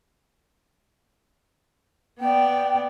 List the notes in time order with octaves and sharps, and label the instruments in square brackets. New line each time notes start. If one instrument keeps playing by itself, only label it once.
[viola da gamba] B3 D5 [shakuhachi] G5